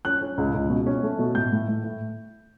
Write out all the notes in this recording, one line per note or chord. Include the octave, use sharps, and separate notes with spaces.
C#4 F#6
C#4
C#2
C#2
B2
C#4
A3
B2
A2 G6
A2
A2
A2